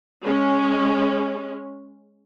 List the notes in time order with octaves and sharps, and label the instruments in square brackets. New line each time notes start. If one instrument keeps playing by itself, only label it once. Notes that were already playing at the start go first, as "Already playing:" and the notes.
[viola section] G#3 C#4